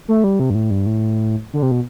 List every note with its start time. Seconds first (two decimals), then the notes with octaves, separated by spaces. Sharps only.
0.08 A3
0.24 G3
0.40 C3
0.50 G2
0.55 A2
0.71 G2
0.86 A2
1.53 D3
1.62 C3
1.71 B2